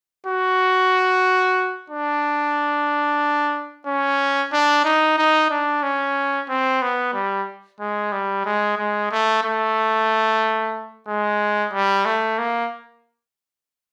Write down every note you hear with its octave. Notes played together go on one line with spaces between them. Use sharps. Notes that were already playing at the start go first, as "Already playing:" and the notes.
F#4
D4
C#4
D4
D#4
D#4
D4
C#4
C4
B3
G3
G#3
G3
G#3
G#3
A3
A3
G#3
G3
A3
A#3